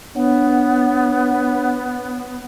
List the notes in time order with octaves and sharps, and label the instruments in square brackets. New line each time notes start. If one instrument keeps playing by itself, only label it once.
[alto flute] B3 [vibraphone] D4 C#5 F#5